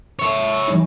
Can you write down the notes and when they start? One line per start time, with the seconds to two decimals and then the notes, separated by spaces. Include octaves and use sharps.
0.19 C#5 E5
0.68 E3 G3 D#4